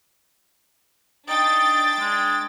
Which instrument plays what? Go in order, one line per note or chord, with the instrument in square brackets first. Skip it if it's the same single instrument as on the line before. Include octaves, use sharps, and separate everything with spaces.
[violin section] D4 G5 A6 [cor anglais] D#4
[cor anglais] G#3